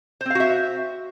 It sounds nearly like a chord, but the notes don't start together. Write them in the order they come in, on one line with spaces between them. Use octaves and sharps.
C5 C4 F5 F#4 E5